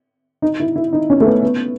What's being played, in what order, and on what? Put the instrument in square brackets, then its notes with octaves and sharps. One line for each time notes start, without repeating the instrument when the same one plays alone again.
[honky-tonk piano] D#4
E4
E4
D#4
C#4
A3
B3
B3